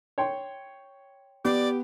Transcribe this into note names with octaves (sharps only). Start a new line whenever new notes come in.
C#5 G5 C6
B3 G4 D5